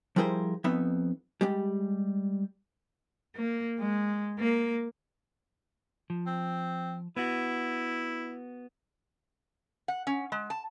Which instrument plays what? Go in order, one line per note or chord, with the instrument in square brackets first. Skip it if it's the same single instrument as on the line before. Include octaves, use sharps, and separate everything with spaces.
[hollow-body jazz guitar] F3 G3 E4 G#4 A#4 C5
F2 B3 D#4 E5 B5
G3 G#3 G4
[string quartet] A#3
G#3
A#3
[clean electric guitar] F3
[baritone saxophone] C4
[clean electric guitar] B3 F#4 [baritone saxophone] E4
[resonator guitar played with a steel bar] F#5
C#4
G#3
A5